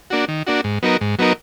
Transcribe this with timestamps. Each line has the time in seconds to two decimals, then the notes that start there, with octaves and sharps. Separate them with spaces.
0.10 A#3 D4 F#4
0.28 D#3
0.47 A#3 D4 F#4
0.64 G#2
0.83 F#3 B3 D#4 A#4
1.01 G#2
1.19 F#3 B3 D#4 A#4